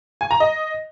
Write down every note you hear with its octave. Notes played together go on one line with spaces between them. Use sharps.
G#5
A#5
D#5